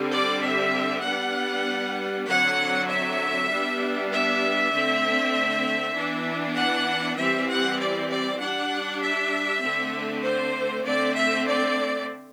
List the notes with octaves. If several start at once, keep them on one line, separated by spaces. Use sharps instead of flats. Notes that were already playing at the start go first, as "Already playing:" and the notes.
Already playing: D3 G3 C4
D5
E5
G3 B3 D4 F#5
D3 F#3 C4 F#5
E5
G3 B3 D4
E5
D3 A3 C4
E3 B3 D4
F#5
E3 G3 C4 E5
F#5
D5
D5
G3 D4 F#5
E5
D3 A3 C4
C5
D3 A3 C4 D5
E5
D5